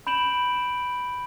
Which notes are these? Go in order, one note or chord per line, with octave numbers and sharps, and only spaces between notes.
B5 G6 D7 E7 F#7